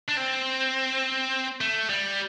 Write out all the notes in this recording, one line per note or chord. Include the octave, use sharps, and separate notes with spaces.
D4
C4
A3
G3